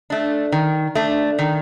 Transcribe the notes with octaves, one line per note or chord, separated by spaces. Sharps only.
A3 D4
D#3
A3 D4
D#3